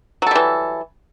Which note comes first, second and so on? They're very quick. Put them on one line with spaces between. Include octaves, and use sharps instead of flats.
F#3 A4 G3 E3